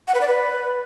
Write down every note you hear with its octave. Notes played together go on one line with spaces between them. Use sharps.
F#5
B4
D5
B4